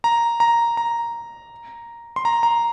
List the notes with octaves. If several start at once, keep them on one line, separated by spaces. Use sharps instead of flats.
A#5
A#5
A#5
C6
A#5
A#5